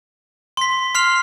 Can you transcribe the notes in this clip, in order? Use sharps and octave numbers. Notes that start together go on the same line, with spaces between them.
C6 B6
C6 F6 C7 F7